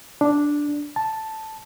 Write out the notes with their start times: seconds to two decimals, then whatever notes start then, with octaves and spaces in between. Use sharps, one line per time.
0.21 D4
0.96 A5